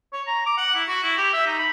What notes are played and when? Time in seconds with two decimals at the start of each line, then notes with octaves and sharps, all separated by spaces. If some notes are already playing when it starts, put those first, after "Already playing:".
0.13 C#5
0.27 A#5
0.46 D6
0.58 F#5
0.75 E4
0.88 F#4
1.03 E4
1.18 G4
1.33 E5
1.46 D#4
1.59 B5